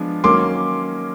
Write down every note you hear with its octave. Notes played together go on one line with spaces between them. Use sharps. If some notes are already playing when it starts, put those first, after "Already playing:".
Already playing: F3 G#3 B3 D4
D#3 F#3 A#3 C#4 C6 D6